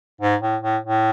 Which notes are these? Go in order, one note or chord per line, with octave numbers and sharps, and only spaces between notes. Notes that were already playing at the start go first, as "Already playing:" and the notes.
G#2
A2
A2
A2